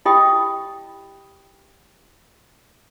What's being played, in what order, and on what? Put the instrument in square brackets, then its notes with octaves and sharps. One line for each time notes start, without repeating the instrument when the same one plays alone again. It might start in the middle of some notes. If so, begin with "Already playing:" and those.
[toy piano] E4 G4 D#5 G5 B5 D#6